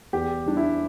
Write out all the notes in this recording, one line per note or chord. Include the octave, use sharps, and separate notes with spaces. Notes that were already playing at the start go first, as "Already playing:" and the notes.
E2 G4
G3 D4
E4